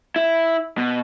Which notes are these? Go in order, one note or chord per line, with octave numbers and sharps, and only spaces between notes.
E4
B2